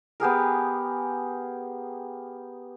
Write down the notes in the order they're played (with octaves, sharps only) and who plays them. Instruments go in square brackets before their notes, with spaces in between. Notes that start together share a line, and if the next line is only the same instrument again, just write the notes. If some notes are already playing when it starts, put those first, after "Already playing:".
[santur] B3 G4 G#4 A#4